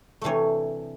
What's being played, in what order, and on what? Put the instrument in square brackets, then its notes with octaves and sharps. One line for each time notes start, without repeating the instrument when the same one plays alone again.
[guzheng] C3 E3 A3 D4 C#5